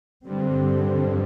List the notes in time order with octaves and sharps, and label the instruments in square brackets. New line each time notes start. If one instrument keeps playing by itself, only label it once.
[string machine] G2 [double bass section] D3 G3 C4
[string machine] F2